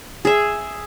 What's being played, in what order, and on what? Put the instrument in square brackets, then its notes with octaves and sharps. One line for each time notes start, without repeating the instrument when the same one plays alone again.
[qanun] G#4 E5